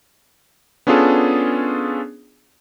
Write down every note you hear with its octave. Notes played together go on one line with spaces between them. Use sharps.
B3 C#4 D4 F4 G#4 A4